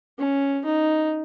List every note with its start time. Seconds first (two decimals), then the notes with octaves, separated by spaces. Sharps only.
0.18 C#4
0.65 D#4